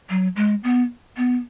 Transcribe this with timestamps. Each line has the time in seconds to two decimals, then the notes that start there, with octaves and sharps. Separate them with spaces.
0.10 F#3
0.36 G#3
0.64 B3
1.17 B3